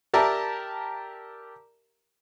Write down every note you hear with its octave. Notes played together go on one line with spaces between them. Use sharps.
G4 A#4 D5 E5 A5 A#5